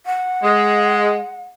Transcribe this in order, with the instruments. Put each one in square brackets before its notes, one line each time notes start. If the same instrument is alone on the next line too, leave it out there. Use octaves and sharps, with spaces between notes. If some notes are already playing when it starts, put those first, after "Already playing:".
[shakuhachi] F#5
[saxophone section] G#3